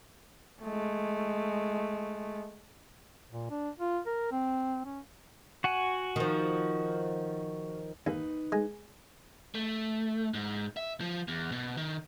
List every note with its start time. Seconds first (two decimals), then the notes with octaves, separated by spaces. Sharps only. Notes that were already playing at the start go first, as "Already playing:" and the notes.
0.63 G#3 A3
3.31 A#2
3.50 D4
3.79 F4
4.06 A#4
4.31 C4
4.85 C#4
5.64 F#4 F#5 G#5
6.16 D#3 F3
8.07 D#2 D#4 B4
8.52 G#3
9.55 A3
10.34 G#2
10.77 E5
11.01 F3
11.28 E2
11.52 B2
11.77 D#3